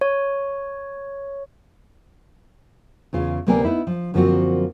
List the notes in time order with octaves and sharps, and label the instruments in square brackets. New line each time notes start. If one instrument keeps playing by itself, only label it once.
[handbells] C#5
[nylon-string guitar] E2 C#3 F4
D2 C3 A#3 B3 D5 G#5
B3 D#4 E4
F3
F#2 D3 F3 A#3 C4 F#4